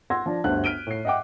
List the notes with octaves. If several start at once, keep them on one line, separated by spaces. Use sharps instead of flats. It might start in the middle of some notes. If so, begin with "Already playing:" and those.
F#5 C6 E6 G#6 A#6
F3 D4
G1 D2 G2 C5 F#6
F6 B6 D7 D#7 G7
A2 C7
D#5 E5 F#5 G5 D6